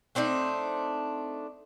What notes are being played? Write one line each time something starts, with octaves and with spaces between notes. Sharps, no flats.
A3 C4 D4 D#4